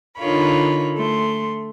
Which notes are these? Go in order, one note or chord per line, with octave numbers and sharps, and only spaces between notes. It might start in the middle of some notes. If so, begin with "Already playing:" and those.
D3 D#4 F4 A#4 C#5 B5
A3 C6